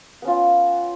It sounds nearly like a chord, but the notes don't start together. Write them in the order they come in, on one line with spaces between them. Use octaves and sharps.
B3 C#4 F4